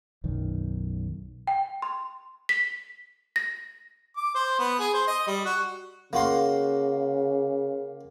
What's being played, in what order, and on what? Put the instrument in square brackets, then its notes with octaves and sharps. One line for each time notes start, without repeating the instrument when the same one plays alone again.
[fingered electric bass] B1 F#2 D#3
[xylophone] G5
C6
B6
A#6
[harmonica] D6
C5
B3
G#4
C5
D#5
G3
F#4
[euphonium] C#3 [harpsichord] A#3 F#4 C6